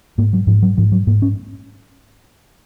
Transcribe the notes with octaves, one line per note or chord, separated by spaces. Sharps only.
G#2 A#3
F#3
G#2 F3
F#3
G#2 F3
F#3
G#2 A#3
C#4